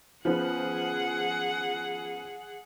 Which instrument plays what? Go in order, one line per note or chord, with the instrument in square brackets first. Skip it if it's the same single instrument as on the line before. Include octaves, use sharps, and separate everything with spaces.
[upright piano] C#3 B3 [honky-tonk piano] F3 [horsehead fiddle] G#4 F#5